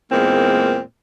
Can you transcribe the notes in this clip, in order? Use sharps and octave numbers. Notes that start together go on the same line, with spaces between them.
E2 A#2 G#3 A#3 C4